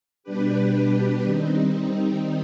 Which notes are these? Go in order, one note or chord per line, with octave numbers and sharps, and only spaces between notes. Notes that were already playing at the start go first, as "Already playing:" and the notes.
B2 G3 D4 G4 B4
D#3 G3 C4 D#4